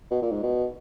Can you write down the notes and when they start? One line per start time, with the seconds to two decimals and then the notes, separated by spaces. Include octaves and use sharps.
0.11 B2
0.22 A#2
0.32 G#2
0.43 B2